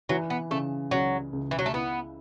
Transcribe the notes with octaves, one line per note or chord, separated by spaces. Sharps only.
E3 F#3
B3
C#3 A3
C#2 F#3
C#2
E3
F#3
A3
B3 E4